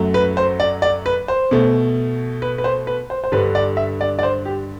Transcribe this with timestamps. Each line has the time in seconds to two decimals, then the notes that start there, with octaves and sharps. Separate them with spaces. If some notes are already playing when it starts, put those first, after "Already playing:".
Already playing: F#2 F#3 A3
0.14 B4
0.37 C5
0.60 D5
0.82 D5
1.06 B4
1.28 C5
1.51 B2 A3
2.42 B4
2.58 B4
2.64 C5
2.87 B4
3.10 C5
3.24 C5
3.32 G2 D3 G3 B4
3.55 D5
3.77 E5
4.01 D5
4.19 D5
4.23 C5
4.45 G4